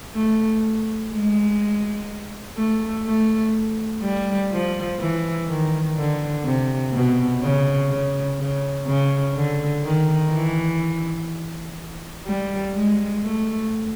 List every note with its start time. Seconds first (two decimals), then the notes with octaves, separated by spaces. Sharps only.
0.15 A3
1.12 G#3
2.57 A3
3.05 A3
4.03 G3
4.51 F3
5.00 E3
5.48 D#3
5.96 D3
6.45 C3
6.93 B2
7.42 C#3
7.89 C#3
8.39 C#3
8.87 C#3
9.35 D3
9.83 D#3
10.32 E3
12.26 G3
12.74 G#3
13.23 A3